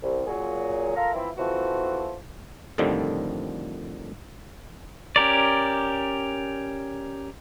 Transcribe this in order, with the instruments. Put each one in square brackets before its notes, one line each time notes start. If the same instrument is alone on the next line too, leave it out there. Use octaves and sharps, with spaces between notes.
[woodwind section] C2
A#2 F#3 G#4
F4 A4 A#4 F5 A#5
E3 F3 C4 E4
E3 F3 A3 C4 F#4
[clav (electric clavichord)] F2 A2 D3 D#3 F3 G3
[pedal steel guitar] C#4 G4 A#4 D5